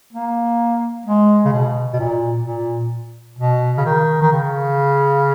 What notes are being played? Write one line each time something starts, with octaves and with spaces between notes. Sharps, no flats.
A#3
G#3
C#3
B2
B2
A#2
A#2
B2
C#3
D#3
D#3
C#3